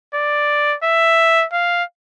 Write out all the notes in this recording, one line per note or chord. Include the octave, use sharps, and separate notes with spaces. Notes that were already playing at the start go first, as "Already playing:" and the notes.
D5
E5
F5